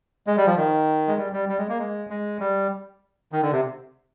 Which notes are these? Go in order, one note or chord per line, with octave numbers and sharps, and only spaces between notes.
G#3
G3
F3
D#3
G#3
G3
G3
G3
G#3
A#3
G#3
G#3
G3
D#3
D3
C3